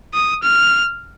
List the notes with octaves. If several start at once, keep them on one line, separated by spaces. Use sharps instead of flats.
D#6
F6